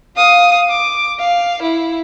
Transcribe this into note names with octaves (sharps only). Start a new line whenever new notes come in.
F5 D#6
D6
F5
E4